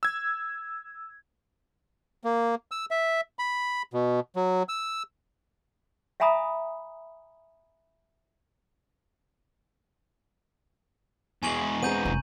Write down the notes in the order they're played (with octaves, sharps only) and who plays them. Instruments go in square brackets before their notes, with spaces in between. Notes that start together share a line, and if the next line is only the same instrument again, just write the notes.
[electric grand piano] E6 G#6
[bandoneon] A#3
E6
E5
B5
B2
F#3
E6
[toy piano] E5 F5 G#5 A#5 B5 D#6
[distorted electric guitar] E2 G#3 [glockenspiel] G#5 C#6 F#7
[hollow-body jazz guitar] B3 C4 G#4 [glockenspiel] A#5 G6 D#7
[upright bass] F1